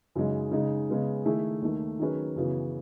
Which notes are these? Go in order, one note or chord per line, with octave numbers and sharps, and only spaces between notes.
F#2 C#3 G#3 D#4
C#3 G#3 D#4
C#3 G#3 B3
D#3 A3 E4 G#4
D#2 D#3 A3
D#3 F#3 C#4 G#4 B4
F#2 C#3 E3 B3 F#4